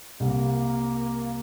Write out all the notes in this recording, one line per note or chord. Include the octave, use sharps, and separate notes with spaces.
C2 A#3